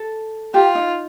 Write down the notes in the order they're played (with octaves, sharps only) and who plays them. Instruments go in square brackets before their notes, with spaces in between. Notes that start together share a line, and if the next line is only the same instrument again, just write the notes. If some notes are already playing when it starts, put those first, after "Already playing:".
Already playing: [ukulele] A4
[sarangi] F4 [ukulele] G4
[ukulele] D#4